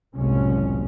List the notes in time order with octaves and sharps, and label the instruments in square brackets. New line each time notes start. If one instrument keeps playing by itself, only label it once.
[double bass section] F#1 C2 A2 F3 G#3 C#4